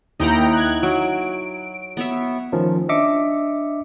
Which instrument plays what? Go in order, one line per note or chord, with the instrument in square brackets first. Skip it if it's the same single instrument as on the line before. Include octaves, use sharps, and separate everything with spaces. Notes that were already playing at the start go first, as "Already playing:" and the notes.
[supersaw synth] D#2 G5 A#5 [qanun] D#4 E4 F#5
[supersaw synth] F#6 G#6
[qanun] F#3 [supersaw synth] D7
[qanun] B3 C#5 E5
[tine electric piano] D#3 F3 A3 C#4 D#4
D4 D#5 E5 D6 C#7